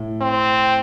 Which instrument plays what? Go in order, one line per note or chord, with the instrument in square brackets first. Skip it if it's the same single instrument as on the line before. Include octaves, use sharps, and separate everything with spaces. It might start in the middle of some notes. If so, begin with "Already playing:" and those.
Already playing: [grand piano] A2
[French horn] C4